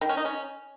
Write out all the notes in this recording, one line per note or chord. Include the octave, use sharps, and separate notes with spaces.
D#3
C#4
D#4
C#4